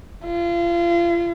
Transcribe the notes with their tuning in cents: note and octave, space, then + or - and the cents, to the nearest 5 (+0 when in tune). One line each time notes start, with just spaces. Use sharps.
F4 -35